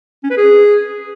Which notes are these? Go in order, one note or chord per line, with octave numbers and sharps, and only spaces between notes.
C#4
B4
G#4